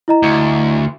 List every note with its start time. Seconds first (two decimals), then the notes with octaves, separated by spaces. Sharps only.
0.08 E4 D#5 A#5
0.23 D2